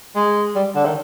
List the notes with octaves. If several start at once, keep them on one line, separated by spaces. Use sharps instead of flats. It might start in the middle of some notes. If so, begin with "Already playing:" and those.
G#3
G3
D3
D#3